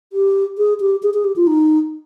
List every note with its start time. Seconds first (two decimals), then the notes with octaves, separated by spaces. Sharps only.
0.13 G4
0.58 G#4
0.80 G4
1.03 G#4
1.14 G#4
1.24 G4
1.36 F4
1.47 D#4